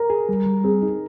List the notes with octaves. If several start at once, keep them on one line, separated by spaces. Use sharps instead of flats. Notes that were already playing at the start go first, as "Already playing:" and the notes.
Already playing: A#4
G#4
G3
G3
C4 G#4
D#4